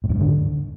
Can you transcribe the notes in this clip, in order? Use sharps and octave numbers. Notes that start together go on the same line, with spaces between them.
A2
F#2
G#2
D3